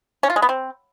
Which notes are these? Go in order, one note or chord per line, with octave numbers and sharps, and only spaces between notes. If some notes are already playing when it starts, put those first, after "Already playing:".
C#4
F4
G#3
B3
C4